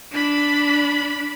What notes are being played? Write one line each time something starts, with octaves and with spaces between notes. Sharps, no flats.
D4 B5